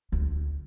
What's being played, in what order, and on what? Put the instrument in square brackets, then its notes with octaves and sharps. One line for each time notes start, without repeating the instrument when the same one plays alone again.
[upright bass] D2